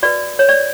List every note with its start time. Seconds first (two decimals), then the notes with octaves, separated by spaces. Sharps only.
0.03 F#4 B4 D5
0.39 C#5
0.49 D5